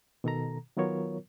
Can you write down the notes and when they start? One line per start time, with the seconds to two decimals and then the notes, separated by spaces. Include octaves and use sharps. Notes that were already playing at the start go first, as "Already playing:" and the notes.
0.24 B2 D#3 A4 A#5
0.77 D#3 F#3 B3 F4 A#4 C#5